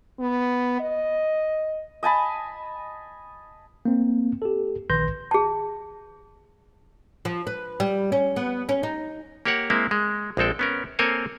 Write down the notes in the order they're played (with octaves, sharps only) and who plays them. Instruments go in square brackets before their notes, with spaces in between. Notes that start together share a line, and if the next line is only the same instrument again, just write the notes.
[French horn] B3
D#5
[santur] D#5 G#5 A5 B5
[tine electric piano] A#3 C4
G4 A4
A#1 D#3 B4 C6 G6 A#6
[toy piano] G#4 A5
[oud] F3
B4
G3
C#4
B3
C#4
D#4
[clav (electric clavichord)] A#3 G4 A#4 C#5 F#5
G#3 A#3 C4 E4
G#3
A#1 G#3 C4 A4 G5
B3 C#4 A#4
A#3 C4 A4 A#4 C#5 G#5